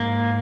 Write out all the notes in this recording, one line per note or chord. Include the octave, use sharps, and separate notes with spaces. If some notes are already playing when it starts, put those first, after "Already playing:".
Already playing: G#2 A#3